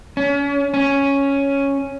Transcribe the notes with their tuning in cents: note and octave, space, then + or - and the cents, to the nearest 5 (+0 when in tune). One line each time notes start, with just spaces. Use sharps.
C#4 +35
C#4 +0